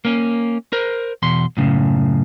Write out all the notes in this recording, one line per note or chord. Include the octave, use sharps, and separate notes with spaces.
A#3 C#4
A#4 C5
E2 B2 C6
F#2 A2 C#3